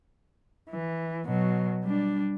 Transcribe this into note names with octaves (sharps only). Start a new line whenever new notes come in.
E3
B2 F#3
G3 D4